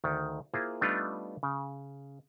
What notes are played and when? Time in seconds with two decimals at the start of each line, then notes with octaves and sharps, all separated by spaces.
0.04 D2 D#3
0.54 A#3 E4 F4 G#4 C5
0.81 G3 A3 B3 D4 D#4 F4
1.43 C#3